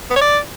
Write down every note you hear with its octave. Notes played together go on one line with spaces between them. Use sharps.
B3
C#5
D5